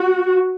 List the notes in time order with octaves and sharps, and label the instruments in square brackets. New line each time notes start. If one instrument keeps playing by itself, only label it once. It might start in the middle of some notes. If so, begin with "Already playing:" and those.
Already playing: [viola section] F#4